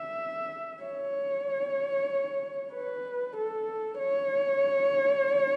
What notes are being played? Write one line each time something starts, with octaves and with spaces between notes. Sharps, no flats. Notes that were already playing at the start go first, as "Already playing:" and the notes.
Already playing: E5
C#5
B4
A4
C#5